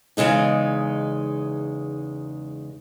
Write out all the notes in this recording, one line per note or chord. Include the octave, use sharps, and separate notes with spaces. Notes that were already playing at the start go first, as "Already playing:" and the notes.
E2 G#2 C#3 G#3 D#4